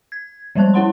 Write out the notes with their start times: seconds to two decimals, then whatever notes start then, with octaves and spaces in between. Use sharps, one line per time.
0.12 G#6
0.55 F3 G3 G#3 C5 A5 F#6
0.74 C#4 E4 C#5 F#5 B5 C6